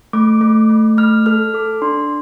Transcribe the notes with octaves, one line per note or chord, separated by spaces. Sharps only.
A3 D6
A3
A3
A3 F6
A4 F6
A4 D6
D4 C6